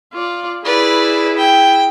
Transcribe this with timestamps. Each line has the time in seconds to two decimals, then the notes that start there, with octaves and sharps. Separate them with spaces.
0.13 F4 D5
0.65 E4 G#4 B4 D5
1.37 G5